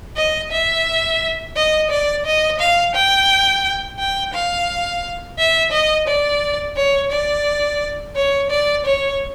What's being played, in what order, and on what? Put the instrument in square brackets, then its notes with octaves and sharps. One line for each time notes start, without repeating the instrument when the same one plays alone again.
[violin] D#5
E5
D#5
D5
D#5
F5
G5
G5
F5
E5
D#5
D5
C#5
D5
C#5
D5
C#5